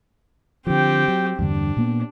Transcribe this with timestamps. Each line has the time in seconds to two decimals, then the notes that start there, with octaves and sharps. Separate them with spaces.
0.67 D3 F3 C4 G4
1.08 F#3
1.39 E2 G2 D3 D4
1.77 A#2 A#3 B3